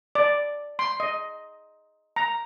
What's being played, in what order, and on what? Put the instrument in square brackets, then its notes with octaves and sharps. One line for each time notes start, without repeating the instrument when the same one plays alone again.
[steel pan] D5
C6
D#5
A#5